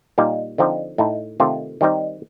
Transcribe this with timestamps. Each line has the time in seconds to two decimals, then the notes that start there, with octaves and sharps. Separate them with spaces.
0.18 A#2 G3 A#3 D#4
0.58 D3 F3 C4 D#4
0.98 A2 A3 D#4
1.40 C3 D#3 A3 C4 F4
1.81 D#3 G3 C4 D#4